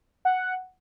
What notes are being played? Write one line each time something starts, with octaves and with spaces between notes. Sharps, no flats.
F#5